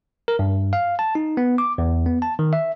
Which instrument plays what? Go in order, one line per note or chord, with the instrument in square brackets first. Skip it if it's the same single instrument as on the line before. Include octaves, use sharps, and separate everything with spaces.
[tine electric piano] A#4
G2
F5
A5
D#4
B3
D6
E2
B3
A5
D#3
E5